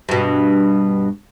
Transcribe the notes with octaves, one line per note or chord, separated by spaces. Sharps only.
G2 B2